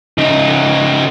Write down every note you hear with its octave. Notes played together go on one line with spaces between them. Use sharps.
C#3 D#4